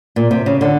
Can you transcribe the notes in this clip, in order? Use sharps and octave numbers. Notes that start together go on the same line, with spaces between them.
A#2
C3
C#3
D3